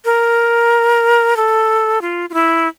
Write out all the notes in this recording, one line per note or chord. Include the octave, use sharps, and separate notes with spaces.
A#4
A4
F4
F4
E4